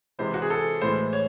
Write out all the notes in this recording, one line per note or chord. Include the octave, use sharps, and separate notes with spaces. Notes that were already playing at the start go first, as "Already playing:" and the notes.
C3 E3 G#3 C5
F#4
G#4
A4
A2 E3 G#3 C5
C#5